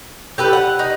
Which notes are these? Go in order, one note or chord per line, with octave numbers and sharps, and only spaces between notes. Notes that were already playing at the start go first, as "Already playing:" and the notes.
G4 A4 B4
F#5
D#4